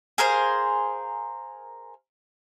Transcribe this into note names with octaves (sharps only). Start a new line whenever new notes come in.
G#4 A#4 C5 F5